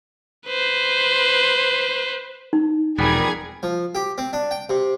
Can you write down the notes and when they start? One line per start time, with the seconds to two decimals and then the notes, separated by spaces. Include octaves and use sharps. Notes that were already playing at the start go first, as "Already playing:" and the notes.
0.47 B4 C5
2.53 D#4
2.99 E1 F2 G3 B3 G#4 A#4 G#6
3.63 F3
3.95 G4
4.18 C4
4.33 D4
4.51 G5
4.70 C3